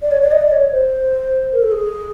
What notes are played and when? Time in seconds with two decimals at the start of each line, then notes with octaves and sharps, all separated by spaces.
0.02 D5
0.11 C#5
0.22 D5
0.32 D#5
0.41 D5
0.51 C#5
0.72 C5
1.53 A#4
1.62 A4
1.72 G#4